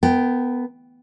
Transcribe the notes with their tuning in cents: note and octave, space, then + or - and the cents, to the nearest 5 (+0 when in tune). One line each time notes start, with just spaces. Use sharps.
B3 +10 A#4 -25 G5 +0